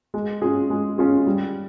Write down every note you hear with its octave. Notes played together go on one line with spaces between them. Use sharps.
G#3
C#4 F4 G#4
G#3
C#4 F4 G#4
G3